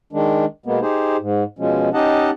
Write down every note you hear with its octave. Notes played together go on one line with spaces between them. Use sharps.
D#3 G#3 D4
B2 G#3 A#3 B3
D#4 G4 G#4 C5
G#2
B2 F3 G#3 C#4
C#4 D#4 G4 D#5 F#5 A5